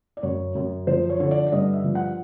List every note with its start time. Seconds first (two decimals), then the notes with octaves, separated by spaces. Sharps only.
0.17 D5
0.23 F#2 C#5
0.55 F#2
0.87 F3 C5
1.10 C#5
1.20 D3 C#5
1.31 D5
1.46 D5
1.52 G2 D#5
1.73 E5
1.84 F3
1.95 F#5